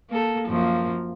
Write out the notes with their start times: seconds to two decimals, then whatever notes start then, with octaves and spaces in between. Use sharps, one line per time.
0.10 A#3 A4
0.47 F#2 F3 A#3